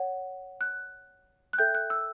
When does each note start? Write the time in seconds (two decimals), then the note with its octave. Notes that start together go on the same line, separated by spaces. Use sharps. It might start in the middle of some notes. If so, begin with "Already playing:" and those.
Already playing: C#5 F#5
0.61 F#6
1.53 F#6
1.58 A4 E5 G5 G6
1.75 F#6
1.90 E6